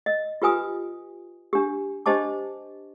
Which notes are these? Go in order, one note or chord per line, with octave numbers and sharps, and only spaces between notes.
D#5
F4 G4 B4 G#5 D#6
D4 G4
D4 G4 C5 D#5 A5 D6